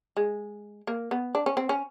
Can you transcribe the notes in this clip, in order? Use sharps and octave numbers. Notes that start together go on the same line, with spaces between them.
G#3
A#3
B3
D4
C#4
C4
C#4